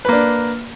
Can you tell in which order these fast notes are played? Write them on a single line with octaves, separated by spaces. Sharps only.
B4 A#3 D4